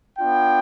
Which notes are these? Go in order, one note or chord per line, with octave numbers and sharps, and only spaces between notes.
B3 D4 F4 G5